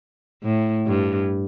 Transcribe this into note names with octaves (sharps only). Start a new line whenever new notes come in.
A2
G2